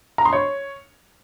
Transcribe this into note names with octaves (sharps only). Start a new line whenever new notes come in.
A#5
C6
C#5